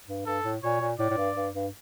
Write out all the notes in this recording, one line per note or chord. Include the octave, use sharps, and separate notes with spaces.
G2
G2 A4
A2
A#2 C#5
A#2
A2 D5
A2
G2
G2
G2